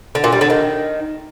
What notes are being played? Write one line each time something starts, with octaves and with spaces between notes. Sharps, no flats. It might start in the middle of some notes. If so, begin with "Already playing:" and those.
D3
A#2
G3
D3
D#3